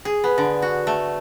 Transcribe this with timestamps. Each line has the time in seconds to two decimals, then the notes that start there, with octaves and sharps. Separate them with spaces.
0.05 G#4
0.24 B3
0.38 D3
0.62 F#4
0.87 A3